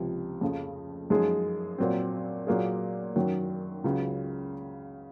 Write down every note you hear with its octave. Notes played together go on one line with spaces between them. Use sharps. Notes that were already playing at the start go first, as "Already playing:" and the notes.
Already playing: C#2 C3 F3
F2 C#3 F3
F#2 F3 G#3 D#4 G#4
A#2 F#3 C4
A#2 F#3 A#3 F4 G#4
F#2 D#3 F#3
C#2 C#3 F#3